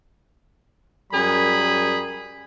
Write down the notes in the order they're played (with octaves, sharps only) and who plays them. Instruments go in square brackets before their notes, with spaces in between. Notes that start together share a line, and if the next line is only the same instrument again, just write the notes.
[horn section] F#2 G3 G#4 A#4 B5